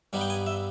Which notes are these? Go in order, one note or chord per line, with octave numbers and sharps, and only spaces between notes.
G2 G3 B3 D#4
G5
G#5
E5